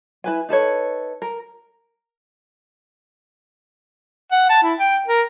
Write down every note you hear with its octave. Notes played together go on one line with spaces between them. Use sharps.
E4 B4 G#5
D#4 A4 B4 C#5
A#4
F#5
A5
E4
G5
A#4